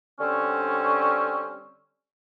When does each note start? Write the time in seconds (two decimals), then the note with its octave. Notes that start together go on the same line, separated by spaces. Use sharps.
0.20 D3 G3 C4 C#4